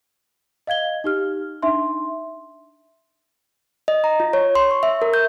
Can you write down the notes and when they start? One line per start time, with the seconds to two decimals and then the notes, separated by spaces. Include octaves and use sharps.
0.67 D#5 F5 G#6 G7
1.04 D#4 G4 F6
1.62 D4 D#4 E5 C6
3.88 D#5
4.04 A#5
4.20 F4
4.33 C#5
4.55 C6
4.71 C#6
4.83 E5
5.02 A#4
5.14 G6